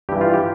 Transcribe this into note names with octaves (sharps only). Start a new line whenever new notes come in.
G2 E3 G4
F4
G4